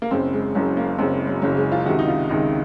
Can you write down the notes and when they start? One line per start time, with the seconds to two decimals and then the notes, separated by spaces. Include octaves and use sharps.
0.02 A#3
0.11 F#1 F#2 C#3 C4
0.33 G#3
0.55 F#1 F#2 C#3 F#3
0.77 A#3
0.98 F#1 F#2 C#3 C4
1.12 G#3
1.27 F#3
1.42 F#1 F#2 C#3 F#3
1.57 G#3
1.72 F4
1.86 C#2 C3 D#3 F#4
1.99 D#4
2.08 F4
2.29 C#2 C3 D#3 D#4